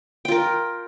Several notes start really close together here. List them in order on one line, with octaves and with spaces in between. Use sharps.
G5 F4 A#4